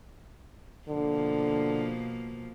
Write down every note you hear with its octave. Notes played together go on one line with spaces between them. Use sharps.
B2 D3 F3 A#3